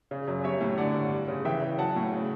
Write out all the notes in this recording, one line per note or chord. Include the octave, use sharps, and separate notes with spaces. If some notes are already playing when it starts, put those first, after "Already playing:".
C#3
F#2
G3 C#5 E5
A2
D3 D5 F#5
G2
G3
C#3
E3 E5 G5
C#3
F#3 F#5 A5
A2
C#3